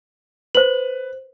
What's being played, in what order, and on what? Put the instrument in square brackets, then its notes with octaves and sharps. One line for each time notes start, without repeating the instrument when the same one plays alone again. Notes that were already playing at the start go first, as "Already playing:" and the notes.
[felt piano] B4 [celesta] C5 F#7